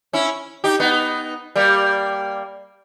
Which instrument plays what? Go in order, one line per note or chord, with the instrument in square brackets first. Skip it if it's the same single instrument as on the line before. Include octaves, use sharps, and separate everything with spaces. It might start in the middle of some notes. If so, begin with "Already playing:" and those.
[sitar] C#4 E4
D#4 G4
B3 D#4
G3 A#3